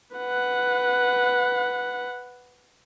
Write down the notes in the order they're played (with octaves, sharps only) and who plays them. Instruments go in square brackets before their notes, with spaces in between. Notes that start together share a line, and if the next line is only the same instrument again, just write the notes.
[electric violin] B4 F#5